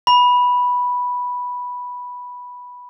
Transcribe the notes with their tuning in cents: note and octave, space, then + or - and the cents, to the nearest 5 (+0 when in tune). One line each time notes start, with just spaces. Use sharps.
B5 -5